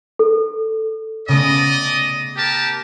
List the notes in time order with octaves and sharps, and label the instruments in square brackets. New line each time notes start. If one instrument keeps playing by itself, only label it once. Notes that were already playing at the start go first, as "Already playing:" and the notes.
[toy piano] A4
[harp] C#3 A3 B3 [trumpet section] D5 D#5 D#6
[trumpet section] G4 A#4 A5